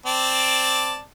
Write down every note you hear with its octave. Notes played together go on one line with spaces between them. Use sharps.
C4 D5 A5